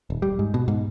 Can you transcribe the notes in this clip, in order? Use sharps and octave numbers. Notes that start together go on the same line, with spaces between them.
D#1
G3
G#2
B2
G#2